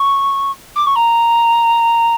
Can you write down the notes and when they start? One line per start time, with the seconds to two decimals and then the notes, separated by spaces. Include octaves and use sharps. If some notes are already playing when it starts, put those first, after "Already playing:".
Already playing: C#6
0.75 D6
0.86 C#6
0.95 A#5